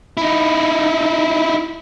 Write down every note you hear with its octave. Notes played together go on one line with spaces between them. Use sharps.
D#4 E4